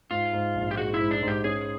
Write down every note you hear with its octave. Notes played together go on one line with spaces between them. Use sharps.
G#2 F4
G#2
A#1
G4
G#3 F#4
E4
G#2
D4
G#2 G4
C#4 G#4